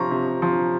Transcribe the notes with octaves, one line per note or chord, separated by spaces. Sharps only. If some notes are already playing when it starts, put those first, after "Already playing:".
Already playing: C3 F3 A#5 C#6
C3
F3